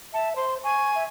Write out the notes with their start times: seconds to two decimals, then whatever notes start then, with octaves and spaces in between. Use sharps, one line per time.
0.14 E5 A5
0.36 C5 C6
0.64 G#5 C#6
0.95 E5